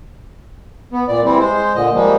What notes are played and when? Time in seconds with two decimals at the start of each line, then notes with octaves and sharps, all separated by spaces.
0.93 B3
1.08 A#2 D5
1.24 E3 G3 C4 E4
1.40 G#3 C5
1.75 A#2 D3 D#5
1.94 F3 G3 G#3 A#3